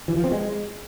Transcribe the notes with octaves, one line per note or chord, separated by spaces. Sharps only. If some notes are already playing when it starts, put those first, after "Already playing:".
E3
F3
C4
G#3